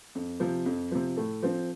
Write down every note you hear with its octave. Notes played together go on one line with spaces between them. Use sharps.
F2
C3 F3
F2
C3 F3
A2 A4
F3 C4